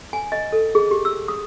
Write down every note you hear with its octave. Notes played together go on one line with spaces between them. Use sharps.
G#5
D#5
A4
G#4
G4
E6
D#6